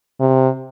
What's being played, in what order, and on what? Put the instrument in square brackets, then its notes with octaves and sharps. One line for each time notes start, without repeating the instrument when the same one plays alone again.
[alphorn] C3